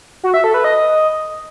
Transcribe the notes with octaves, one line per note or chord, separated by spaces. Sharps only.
F#4
E5
A4
B4
D#5